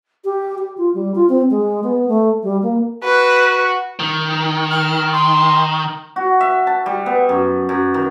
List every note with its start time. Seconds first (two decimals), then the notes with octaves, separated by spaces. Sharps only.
0.25 G4
0.58 G4
0.77 F4
0.94 G3
1.15 F4
1.29 C4
1.51 G#3
1.84 B3
2.08 A3
2.43 G3
2.63 A#3
3.04 F#4 B4
3.99 D#3
4.71 F6
5.12 C6
6.16 F#4
6.41 E5
6.67 A5
6.86 G3
7.06 B3
7.29 F#2
7.69 F#2
7.94 D#3